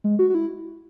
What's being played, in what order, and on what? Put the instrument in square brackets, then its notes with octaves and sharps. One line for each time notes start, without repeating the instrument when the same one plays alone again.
[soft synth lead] G#3
F#4
F#4
E4